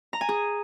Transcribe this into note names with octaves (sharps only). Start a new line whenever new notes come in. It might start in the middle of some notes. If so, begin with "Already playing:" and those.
A#5
G#5
G#4